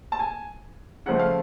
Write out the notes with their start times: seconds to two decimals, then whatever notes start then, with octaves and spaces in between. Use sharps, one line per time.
0.12 A5
0.19 G#5
1.06 C#3 F3 A3 F#5
1.19 F5